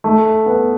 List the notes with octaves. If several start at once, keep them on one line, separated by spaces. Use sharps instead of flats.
A3
B3